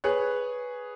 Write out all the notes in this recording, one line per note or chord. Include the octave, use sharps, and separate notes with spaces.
G#4 B4 C#5 F#6